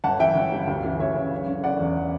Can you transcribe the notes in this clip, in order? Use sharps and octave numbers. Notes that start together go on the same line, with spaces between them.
G1 F#5 A5
E3 E5 G5
G1
G2
D2
E3
D2 C#5 E5
C#3
F#1
D3
F#1 D5 F#5
E2